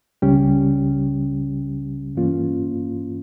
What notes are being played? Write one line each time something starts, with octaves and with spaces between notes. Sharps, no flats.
C#2 C#3 G3 C#4 G4
G2 E3 A#3 C#4 F4